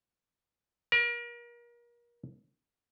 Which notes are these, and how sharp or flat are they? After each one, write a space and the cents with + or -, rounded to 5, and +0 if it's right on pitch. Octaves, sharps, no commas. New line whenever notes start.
A#4 +35